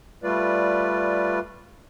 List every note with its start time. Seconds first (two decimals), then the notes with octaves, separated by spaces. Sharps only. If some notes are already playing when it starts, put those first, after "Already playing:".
0.23 G3 A3 F4 B4 D5